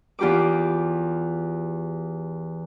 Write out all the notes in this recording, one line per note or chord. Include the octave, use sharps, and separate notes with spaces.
E2 F4 G4 B5 D6